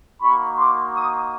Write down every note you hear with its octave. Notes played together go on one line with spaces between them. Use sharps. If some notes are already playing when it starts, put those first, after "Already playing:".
A#3 D#4 F#4 B5 C#6
C6 D6
C#6 D#6